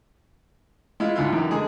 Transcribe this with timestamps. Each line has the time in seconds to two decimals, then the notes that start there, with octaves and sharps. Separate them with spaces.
1.00 G#3 E4 F4
1.16 D2 G#2 E4 F4
1.33 F#2 D#3 E3
1.51 D3 G#3 G#4